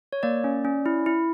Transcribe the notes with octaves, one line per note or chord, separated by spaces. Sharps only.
C#5
A#3 D5
C#4
C#4
E4
E4